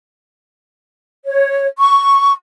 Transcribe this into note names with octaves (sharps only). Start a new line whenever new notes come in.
C#5
C#6